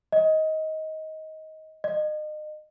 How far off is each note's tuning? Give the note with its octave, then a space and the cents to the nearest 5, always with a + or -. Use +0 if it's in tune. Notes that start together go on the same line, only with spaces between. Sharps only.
D#5 +15
D#5 -35